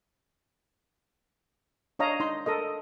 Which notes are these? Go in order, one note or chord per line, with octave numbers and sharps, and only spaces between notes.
D4 C#5 D#5 F5 A#5
D#4 C6
A4 A#4 D#5